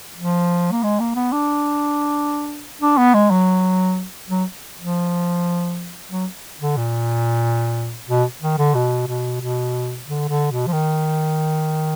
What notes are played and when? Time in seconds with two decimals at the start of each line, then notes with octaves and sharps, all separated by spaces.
0.17 F3
0.72 A#3
0.83 G#3
1.00 A#3
1.16 B3
1.33 D4
2.81 D4
2.97 B3
3.14 G#3
3.31 F#3
4.29 F#3
4.79 F3
6.11 F#3
6.60 D3
6.77 A#2
8.09 B2
8.42 D#3
8.58 D3
8.75 B2
9.08 B2
9.41 B2
10.07 D3
10.29 D3
10.51 B2
10.67 F3
10.73 D#3